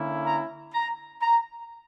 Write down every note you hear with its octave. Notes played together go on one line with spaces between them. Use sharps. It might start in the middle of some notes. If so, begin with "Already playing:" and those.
Already playing: D3 A#3 C#4 E4
A#5
A#5
A#5